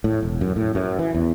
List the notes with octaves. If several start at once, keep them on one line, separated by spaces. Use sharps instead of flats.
A2
E1
F#2
A2
F#2
E3
E2